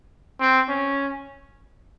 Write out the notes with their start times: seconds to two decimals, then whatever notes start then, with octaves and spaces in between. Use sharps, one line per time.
0.40 C4
0.69 C#4